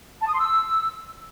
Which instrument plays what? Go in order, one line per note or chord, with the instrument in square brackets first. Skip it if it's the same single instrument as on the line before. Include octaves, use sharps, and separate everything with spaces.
[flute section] A5
D#6
C6
E6